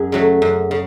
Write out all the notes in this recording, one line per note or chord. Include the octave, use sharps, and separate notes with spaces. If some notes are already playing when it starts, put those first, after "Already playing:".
Already playing: F#2 G#4
C#3 F#3 A3
F#2
C#3